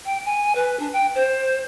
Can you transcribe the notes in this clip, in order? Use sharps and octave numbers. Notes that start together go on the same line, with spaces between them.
G5
G#5
B4
D4
G5
C5